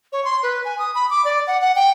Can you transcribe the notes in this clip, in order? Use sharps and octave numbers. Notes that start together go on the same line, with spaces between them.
C#5
C6
B4
G#5
D#6
B5
D6
D5
F#5
F#5
G5